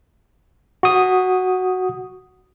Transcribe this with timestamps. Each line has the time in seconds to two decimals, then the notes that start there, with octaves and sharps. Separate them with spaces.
0.83 F#4 D#6